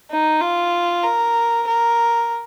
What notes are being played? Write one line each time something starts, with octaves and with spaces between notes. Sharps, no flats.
D#4
F4
A#4
A#4